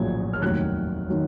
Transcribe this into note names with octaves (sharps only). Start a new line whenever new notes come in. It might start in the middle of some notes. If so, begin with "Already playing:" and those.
Already playing: A#1 A#2 F#3 G#6
F6
F1 D#2 D#3 F#3 F#6
D#3 F#3